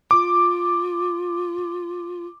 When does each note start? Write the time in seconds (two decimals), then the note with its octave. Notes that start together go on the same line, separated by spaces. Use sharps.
0.11 F4 D6